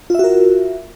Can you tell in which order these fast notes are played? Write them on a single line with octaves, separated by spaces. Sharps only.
F4 E5 F#4 A#4